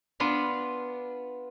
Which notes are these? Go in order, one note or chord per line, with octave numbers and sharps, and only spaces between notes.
B3 D4 F4 B4